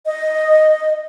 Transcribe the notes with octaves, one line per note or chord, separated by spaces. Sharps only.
D#5